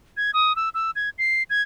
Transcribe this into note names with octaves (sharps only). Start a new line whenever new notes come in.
G#6
D#6
E6
E6
G#6
C7
G#6